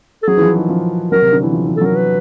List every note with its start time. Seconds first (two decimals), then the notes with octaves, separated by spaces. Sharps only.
0.23 A4
0.28 F#3 G#4
0.37 E3
0.42 F3
0.56 D#3
0.69 F3
1.12 F#3 A#4
1.22 C3
1.33 D3
1.43 E3
1.53 F3
1.67 E3
1.76 A4
1.81 F#3 A#4
1.95 B4